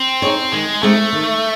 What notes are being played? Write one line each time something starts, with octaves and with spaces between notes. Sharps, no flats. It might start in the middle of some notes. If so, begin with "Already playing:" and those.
Already playing: C4
D#4 G#4 C#5
D#3 G#3
G#3 A3 C4 D#4 G#4
D#3